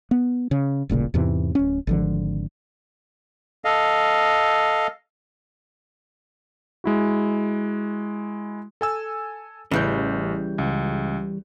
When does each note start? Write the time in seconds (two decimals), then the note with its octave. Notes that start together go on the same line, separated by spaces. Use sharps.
0.11 B3
0.51 C#3
0.89 D#1 A1 A#2 C#3
1.14 E2 G#2 C3 E3
1.55 D1 C#4
1.87 G#1 D3 F3
3.65 A4 D#5 F5
6.84 G#3 E4 F#4
8.81 A4 G#5 E6
9.71 A1 C#3 E3 G3 G6
10.58 C#2